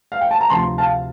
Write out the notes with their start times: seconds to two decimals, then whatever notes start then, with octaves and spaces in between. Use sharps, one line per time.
0.12 F5
0.21 G5
0.31 A5
0.41 A#5
0.50 D2 C3 F3 A5 C6
0.78 F5 A5